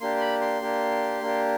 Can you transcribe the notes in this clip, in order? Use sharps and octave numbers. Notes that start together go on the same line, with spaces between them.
A#3 D4 G4 C6
C6
B5
C6
A#3 D4 G4
A#3 D4 G4